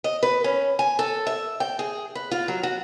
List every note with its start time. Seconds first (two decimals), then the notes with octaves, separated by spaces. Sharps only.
0.04 D#5
0.23 B4
0.44 C#4
0.79 G#5
0.99 A4
1.27 E5
1.60 G5
1.79 G#4
2.15 B4
2.31 F4
2.48 F#3
2.63 F#4